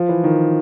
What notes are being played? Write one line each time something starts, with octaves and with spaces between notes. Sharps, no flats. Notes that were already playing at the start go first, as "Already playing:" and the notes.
Already playing: F3
E3
D#3